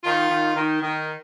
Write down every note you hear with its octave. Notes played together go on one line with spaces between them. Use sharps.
D#3 F4
D#3
D#3
D#3